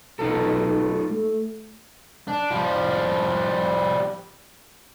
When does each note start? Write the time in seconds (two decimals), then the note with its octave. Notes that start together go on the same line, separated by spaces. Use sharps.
0.19 B1 D#4 F4 A4
1.11 A3
2.28 D4
2.51 F3 G3